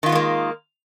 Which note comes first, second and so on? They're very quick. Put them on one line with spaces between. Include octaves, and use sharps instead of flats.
D#3 F4 B3 G#3 A#3